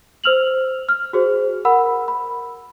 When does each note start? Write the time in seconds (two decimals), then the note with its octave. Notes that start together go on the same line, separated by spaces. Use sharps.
0.24 C5 E6 F6 F7 F#7
0.89 F6
1.13 F#4 G#4 C5
1.65 A#4 F#5 B5 E6
2.08 B5